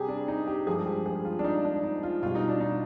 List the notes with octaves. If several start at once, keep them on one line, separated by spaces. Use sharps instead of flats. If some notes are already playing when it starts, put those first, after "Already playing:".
Already playing: C3 G3 G4 G#4
D4
D#4
G4
G2 F3 G#3 G#4
G4
G#4
F4
D4
D#4
D4
D#4
F4
B2 G3 F4
D#4
D4
D#4